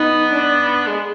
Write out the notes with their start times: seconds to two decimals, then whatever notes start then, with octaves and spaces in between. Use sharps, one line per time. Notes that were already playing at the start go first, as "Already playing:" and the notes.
Already playing: B3 D#4
0.33 D4
0.87 G#3